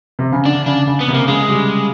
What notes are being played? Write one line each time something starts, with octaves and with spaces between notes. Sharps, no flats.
C3
C#3
D3 D4
C#3 D4
C#3
B3
C3
A#3
C#3 G#3
G3